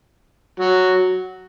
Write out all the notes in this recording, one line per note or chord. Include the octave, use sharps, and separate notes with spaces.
F#3